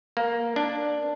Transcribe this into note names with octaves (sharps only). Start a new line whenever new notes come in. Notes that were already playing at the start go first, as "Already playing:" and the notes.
A#3
D4